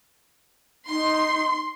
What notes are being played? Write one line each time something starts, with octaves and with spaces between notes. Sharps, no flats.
D#4 C6